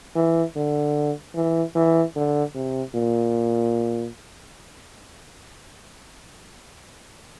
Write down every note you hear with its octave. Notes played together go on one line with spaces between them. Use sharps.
E3
D3
E3
E3
D3
C3
A#2